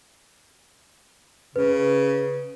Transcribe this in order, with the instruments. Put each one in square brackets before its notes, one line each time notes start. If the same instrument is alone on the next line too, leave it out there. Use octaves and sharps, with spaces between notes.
[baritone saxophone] C#3 [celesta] B4